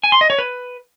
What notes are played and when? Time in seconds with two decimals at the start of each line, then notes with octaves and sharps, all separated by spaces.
0.04 G#5
0.12 C6
0.21 D#5
0.30 C#5
0.39 B4